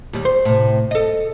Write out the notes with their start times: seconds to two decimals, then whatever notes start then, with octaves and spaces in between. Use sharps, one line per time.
0.13 D#2 G3
0.25 C5
0.45 A2 C3
0.91 A4 D#5